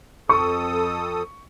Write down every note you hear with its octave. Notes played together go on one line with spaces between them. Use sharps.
F2 A4 C#6 D#6